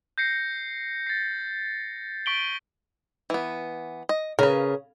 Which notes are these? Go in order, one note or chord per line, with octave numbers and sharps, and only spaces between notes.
G6 A#6 C7 C#7
A6 C7
C#6 B6 D7 F#7 G7
E3 B3
D#5
C#3 A#4 B4